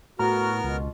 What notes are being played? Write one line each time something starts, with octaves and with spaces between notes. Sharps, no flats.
A2 B3 F#4 A#4 A#5 F6
C#2 B2 F4